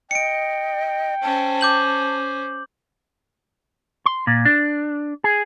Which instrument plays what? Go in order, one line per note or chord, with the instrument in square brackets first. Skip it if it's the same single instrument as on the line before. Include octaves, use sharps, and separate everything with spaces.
[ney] D#5 [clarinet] G5 [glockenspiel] C#7 D7
[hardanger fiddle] C#4 C5 [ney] A5
[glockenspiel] D6 G6 F#7
[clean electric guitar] C6
A#2
D4
G#4